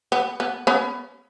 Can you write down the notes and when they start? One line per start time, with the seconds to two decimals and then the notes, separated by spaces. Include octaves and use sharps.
0.12 B3
0.40 B3
0.67 B3 C#4